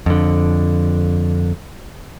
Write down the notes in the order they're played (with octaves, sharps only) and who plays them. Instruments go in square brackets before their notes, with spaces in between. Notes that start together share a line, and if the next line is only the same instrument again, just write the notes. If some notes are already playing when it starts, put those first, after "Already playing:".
[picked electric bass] F2 D3